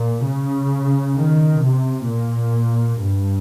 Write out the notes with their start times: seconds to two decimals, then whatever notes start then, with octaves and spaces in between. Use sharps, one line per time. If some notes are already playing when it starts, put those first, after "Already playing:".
Already playing: A#2
0.26 C#3
1.16 D#3
1.63 C3
2.08 A#2
2.99 G2